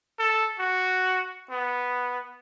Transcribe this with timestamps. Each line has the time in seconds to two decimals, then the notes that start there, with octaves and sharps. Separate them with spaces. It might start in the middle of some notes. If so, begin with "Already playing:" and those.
0.19 A4
0.59 F#4
1.50 B3